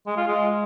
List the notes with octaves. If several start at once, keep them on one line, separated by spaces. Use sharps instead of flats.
G#3
F4
G#3